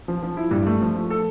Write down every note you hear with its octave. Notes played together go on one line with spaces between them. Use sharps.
F3
F3
E4
G2
A3
F3
A3
A4